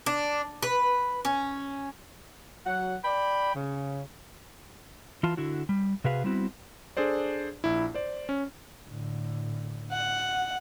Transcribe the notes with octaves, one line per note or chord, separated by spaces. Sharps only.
D4
B4
C#4
F#3 F#5
D5 G5 B5
C#3
E3 F4 A5
D3 E4 F#4
G3
C3 F#4 G#4 B4 F5
G3 B3 C4 E4 F#4
D4 G#4 A4 C5 D5
A#1 E4
C5 D5
C#4
A2 D3
F#5